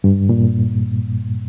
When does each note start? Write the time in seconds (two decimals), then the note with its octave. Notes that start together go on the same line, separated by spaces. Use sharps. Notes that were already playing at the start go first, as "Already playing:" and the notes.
0.04 G2
0.29 A#2